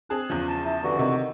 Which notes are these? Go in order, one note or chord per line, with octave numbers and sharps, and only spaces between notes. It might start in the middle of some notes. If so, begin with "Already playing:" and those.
C4 G#4 A5 F#6
E2 C#3 F3
A5
E4 A5
G2 D3 E3 F#4
C3 D#3